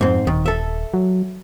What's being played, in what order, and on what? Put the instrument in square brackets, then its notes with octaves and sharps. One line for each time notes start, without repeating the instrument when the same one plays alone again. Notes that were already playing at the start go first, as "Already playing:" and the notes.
[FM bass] F2 [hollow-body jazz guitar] G#2 C4
[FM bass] D#1 [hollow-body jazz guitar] D#3
[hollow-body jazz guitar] A4 E5
[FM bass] F#3